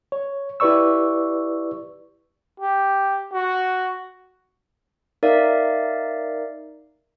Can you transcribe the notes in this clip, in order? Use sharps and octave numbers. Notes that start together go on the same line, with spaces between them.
C#5
E4 G4 B4 D5 C#6 E6
G4
F#4
D#4 A#4 D5 E5 F5